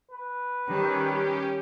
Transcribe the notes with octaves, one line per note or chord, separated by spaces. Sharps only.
B4
D#3 G3 C#4 G4